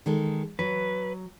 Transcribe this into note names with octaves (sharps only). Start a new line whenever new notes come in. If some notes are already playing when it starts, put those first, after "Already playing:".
D#3 G#3 A4
F#3 B4